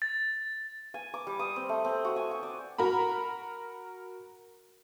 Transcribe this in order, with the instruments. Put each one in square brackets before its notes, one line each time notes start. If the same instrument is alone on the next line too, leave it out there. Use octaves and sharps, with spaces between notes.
[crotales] A6
[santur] G#5
D6
G3
D#6
C4
A3
C4
F#4
G#5
G#5
D5
[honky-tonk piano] F#4 A#4 A#5 B5